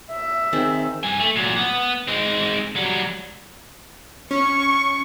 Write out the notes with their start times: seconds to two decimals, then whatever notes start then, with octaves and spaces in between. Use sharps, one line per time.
0.12 E5
0.53 D#3 C4 G#4
1.03 G2 G#5
1.19 A3
1.36 A#2 F#3
1.56 B3
2.07 G#3 C4
2.76 F#3 G3
4.31 C#4 C#6